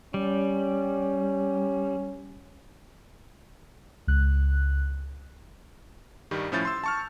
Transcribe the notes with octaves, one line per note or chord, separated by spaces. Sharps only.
G3 C#4
C#2 F#6
G2 D#3 G3
A2 F3 C#4 E4 G6 A6
C6 E6
A5 C#6 F6